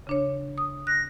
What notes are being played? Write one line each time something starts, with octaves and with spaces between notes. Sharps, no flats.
C#3 D4 C#5
D#6
F#6 A#6